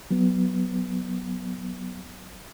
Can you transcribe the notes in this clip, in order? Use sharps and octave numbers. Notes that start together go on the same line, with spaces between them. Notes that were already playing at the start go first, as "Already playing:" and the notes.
F#3 B3